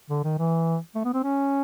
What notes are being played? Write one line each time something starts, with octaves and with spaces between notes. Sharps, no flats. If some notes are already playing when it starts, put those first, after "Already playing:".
D3
D#3
E3
A3
B3
C4
C#4